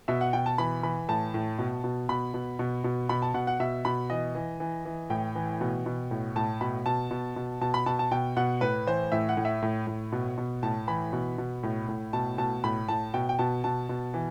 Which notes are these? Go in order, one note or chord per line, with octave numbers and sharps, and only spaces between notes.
B2 E5
F#5
B2 G5
A5
E3 B5
E3 B5
A2 A5
A2
B2
B2
B2 B5
B2
B2
B2
B2 B5
A5
B2 F#5
F#5
B2 E5
B2 B5
E3 D#5
E3
E3
E3
A2 G5
E3
B2
B2
A2
A2 A5
B2 B5
B2 A5
B2
B2
B2 A5
B5
B2 A5
A5
B2 G5
B2 F#5
A2 B4
E3 C5
A2 E5
F#5
A2
E5
A2
A2
B2
B2
A2 A5
E3 B5
B2
B2
A2
A2
B2 A5
B2 A5
A2 B5
A2 A5
B2 G5
G5
B2 A5
B2 A5
B2
E3